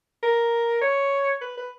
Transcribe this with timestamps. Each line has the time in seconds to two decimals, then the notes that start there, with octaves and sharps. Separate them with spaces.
0.23 A#4
0.81 C#5
1.42 B4
1.58 B4